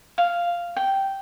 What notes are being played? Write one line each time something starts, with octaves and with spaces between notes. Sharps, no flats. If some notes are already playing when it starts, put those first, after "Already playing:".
F5
G5